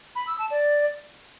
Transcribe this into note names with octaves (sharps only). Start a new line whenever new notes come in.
B5
E6
A5
D5